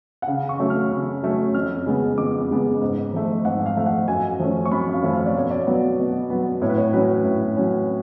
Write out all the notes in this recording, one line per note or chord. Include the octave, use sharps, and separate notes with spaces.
F#5
C#3 F5
C#6
F#3 A3 C#4
F6
C#3
F#3 A3 C#4
F2 F6
C#3 G#3 B3
F2 D6
C#3 G#3 B3
G#2
F3 A3
G#2 F#5
F5
F3 A3
F#5
F#2 G#5
F3 A3 C#4
C#6
F#2 B5
F5
F3 A3 C#4
F5
D5
B2 C#5
D5
F#3 B3
B2
F#3 B3
A2 C#5
B4
C#5
F#3 C#4 B4
A2
F#3 C#4